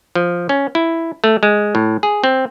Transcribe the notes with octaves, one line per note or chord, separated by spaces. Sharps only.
F3
C#4
E4
A3
G#3
A2
G#4
C4